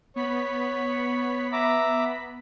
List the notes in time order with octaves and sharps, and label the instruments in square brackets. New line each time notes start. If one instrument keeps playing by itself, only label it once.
[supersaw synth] B3 B5 B6 [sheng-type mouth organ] C#5
[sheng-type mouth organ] E5 A#5 D6